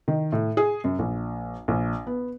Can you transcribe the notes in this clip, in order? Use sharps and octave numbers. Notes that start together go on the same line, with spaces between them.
D#3
A2
G#4
F#2
A#1
A#1
B3